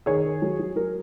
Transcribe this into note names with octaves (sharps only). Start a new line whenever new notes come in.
D#3 G#4 C#5
D#3
F#3
F#3
F#3 A#4